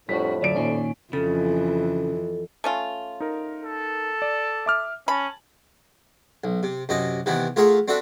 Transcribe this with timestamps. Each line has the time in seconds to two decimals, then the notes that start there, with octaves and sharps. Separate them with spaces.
0.09 F2 A2 G3 D4 F#4 B6
0.42 D2 F#3 D5 D7
0.56 A#2 D#3 C#4
1.13 F2 C#3 E3 A4
2.64 A3 C#4 F4
3.20 D#4 A#4
3.63 A4
4.22 D5
4.66 E5 D6 F6
5.08 C#4 G#5 A5 B5
6.44 B1
6.63 C3
6.89 F#2 C3 E4 D#5
7.26 C3 D#3 E3 B3 E4
7.56 A3 F4 G#4 A#4 E5 F#5
7.88 C4 D4 F#4 A4 E5